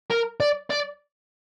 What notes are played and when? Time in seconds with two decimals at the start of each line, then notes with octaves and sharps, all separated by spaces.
0.11 A#4
0.40 D5
0.70 D5